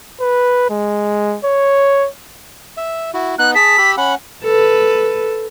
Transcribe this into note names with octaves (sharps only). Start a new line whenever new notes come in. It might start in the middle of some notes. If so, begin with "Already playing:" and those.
B4
G#3
C#5
E5
E4 F#4
B3 D#4 F#6
G#4 A5 B6
G4 B5 E6
C#4 F#5 B5
A4 B4